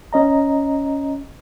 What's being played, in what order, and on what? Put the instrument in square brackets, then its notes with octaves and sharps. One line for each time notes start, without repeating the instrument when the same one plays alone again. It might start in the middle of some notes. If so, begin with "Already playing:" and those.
[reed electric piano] C#4 D#5 A#5